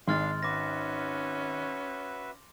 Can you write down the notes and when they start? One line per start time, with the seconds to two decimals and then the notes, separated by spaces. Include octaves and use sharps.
0.08 G#1 G#3 D4 F5 C6 F6 A6
0.43 C#4 F#4 B4 E5 D6 A#6